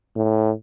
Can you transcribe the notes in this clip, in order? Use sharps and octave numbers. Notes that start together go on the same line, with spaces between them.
A2